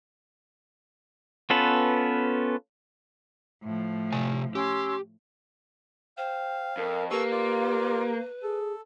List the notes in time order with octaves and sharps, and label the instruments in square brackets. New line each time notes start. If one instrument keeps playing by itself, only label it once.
[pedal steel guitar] B3 C#4 F4 A4 B4
[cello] A2 F3
[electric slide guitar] C3 G#5
[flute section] C#4 C6 E6 [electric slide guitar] G4
[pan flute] C5 [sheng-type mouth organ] F5 [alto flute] G5
[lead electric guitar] F2 [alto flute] A#4
[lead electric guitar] A#3 [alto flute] G4 [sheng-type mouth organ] A4 C#6 E6 [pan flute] B4
[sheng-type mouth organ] F4 D5
[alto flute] G#4 [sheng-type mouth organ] A4